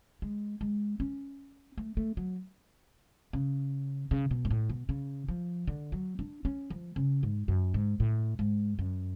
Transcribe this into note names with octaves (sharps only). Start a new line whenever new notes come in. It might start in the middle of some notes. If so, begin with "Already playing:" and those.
G#3
G#3
C#4
A3
A3
F#3
C#3
C#3
B2
G#2
A2
B2
C#3
F3
D3
F#3
D4
C#4
F3
C#3
G#2
F#2
G#2
A2
G#2
F#2